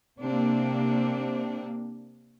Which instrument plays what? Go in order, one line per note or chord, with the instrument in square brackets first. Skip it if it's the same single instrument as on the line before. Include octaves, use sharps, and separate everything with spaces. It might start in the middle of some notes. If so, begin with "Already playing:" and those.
[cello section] C3 A#3 C4 D4